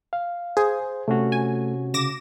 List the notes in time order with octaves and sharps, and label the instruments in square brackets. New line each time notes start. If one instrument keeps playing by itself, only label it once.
[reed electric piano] F5
[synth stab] G#4 [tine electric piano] C5
[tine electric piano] C3 C#4 F#4 [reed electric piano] A3
[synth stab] G#5
[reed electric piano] C#3 [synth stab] D6 A#6 E7